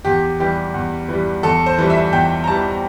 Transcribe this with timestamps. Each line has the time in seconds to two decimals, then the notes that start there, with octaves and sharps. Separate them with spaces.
0.05 E2 G4
0.40 E3 G3 G4
0.74 E2
1.09 E3 G3
1.43 E2 A4
1.66 C5
1.78 E3 G3
1.90 E5
2.12 E2 G5
2.44 A#5
2.47 E3 G3 A5